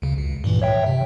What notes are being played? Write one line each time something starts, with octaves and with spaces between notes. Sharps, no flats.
D2 C#3
C#2
G2 A#2 E3
C#5 E5 G5
C3